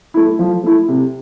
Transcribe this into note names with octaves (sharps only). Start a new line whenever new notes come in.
A3 E4
F3
A3 E4
C3